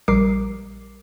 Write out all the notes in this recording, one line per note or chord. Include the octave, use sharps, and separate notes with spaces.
A#1 G3 A#4 D6 C7